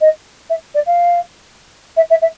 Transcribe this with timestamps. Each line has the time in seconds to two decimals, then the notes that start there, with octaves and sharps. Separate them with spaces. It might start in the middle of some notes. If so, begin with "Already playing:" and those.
0.01 D#5
0.49 E5
0.74 D5
0.86 F5
1.96 E5
2.10 E5
2.21 E5